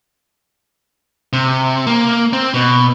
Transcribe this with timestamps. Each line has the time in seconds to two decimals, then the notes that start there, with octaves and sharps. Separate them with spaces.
1.33 C3
1.87 A#3
2.33 C4
2.54 B2